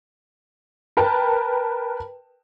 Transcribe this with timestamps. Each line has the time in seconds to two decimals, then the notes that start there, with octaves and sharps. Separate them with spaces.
0.97 A#4 B4 G5 A5